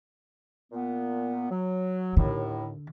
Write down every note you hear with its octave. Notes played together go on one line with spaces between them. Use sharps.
A#2 B3
F#3
D#2 A2 D3